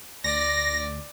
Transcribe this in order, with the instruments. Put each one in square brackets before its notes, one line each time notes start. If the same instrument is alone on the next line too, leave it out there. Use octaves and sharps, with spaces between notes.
[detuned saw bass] D2 [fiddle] D5 [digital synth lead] A#6